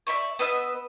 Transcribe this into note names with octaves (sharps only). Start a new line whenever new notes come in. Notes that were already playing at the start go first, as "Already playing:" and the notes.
D5 E5 B5 C#6
B3 B4 D#5 E6